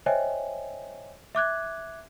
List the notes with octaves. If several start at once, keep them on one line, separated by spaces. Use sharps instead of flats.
C5 C#5 D#5 E5 G5 G#5
E5 D6 F#6 G#6